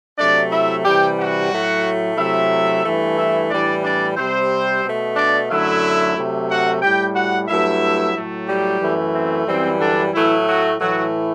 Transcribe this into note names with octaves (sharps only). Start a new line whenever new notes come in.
C3 F#3 A3 D4 D5
E4 E5
C3 E3 G3 G4 G5
F#4 F#5
A2 F#3 A3
C3 F#3 A3 E4 E5
G2 E3 A3
E4 E5
A2 E3 G3 D4 D5
D4 D5
C3 G3 C4 C5
B2 A3
D4 D5
F#2 D3 F#3 A3 E4 E5
C3 F#3 A3
F#4 F#5
A2 G3 G4 G5
F#4 F#5
G2 F#3 A3 E4 E5
A2 F#3 A3
G3 G4
F#2 E3 A3
C4
F#2 E3 G3 C4
D3 D4
A2 E3 F#3 A3 E4
F#3 F#4
A2 E3 F#3 A3 F#4